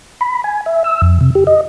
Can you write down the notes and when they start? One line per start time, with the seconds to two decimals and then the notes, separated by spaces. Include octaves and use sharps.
0.21 B5
0.44 G#5
0.66 E5
0.84 E6
1.02 F2
1.21 C3
1.35 G4
1.47 D#5